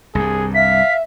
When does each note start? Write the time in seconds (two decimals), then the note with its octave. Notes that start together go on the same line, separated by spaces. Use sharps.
0.15 C2 G2 G#4
0.54 E5 F5 B6